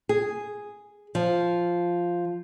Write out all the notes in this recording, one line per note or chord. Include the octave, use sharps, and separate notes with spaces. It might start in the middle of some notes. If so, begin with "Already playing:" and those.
G#4
F3